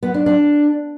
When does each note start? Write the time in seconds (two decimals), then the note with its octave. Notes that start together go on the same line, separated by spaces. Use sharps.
0.03 B3
0.14 D4
0.26 D4